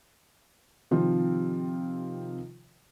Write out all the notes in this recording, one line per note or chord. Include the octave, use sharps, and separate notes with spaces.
C3 D#3 F3 C4 F4